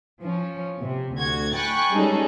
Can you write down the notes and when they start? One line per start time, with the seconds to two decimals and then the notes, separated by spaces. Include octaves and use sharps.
0.22 F3 C#4
0.79 C3
1.17 D2 F#4 G#6
1.54 G5 G#5 B5 C#6 F#6 A6
1.94 G3 G#3 C#4 D#4 G#4 A4